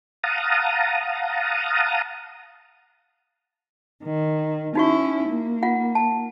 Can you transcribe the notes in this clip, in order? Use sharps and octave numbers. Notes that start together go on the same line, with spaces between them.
F5 F#5 A5 A#5 D#6
D#3
C#4 D#4 E4 F#4 C#6
A#3
F4 F#5
A5